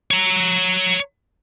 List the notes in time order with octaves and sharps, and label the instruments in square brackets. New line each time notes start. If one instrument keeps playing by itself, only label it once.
[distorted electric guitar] C#5 A#5